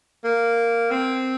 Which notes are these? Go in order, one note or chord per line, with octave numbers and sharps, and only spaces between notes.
A#3
C4